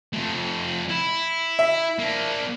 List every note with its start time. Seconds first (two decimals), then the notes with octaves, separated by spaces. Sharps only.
0.14 F2 A3
0.90 E4
1.59 E5
1.99 A#3 D4